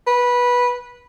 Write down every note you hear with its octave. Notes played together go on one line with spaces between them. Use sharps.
B4